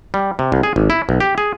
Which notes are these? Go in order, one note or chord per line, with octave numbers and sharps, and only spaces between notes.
G3
C3
C2
G#4
G#1
E4
B1
G4
G#4